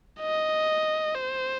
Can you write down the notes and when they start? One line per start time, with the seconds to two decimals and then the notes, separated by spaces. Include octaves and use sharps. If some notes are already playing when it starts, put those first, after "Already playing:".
0.20 D#5
1.15 C5